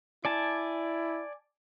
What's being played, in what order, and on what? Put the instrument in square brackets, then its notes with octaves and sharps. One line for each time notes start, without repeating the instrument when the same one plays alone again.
[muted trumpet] E4 [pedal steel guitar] D5 G#5 A5